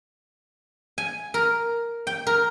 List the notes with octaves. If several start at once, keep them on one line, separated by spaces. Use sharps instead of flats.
G#5
A#4
G5
A#4